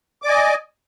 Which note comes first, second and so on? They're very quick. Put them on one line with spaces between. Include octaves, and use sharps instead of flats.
D6 D5 G#5 D#5